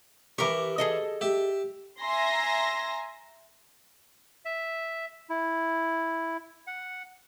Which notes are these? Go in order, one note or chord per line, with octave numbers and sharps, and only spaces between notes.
E3 G4 A#4 C#6
G#4 A4 D#5
G4 E5
E5 G#5 A#5 C6 A#6
E5
E4
F#5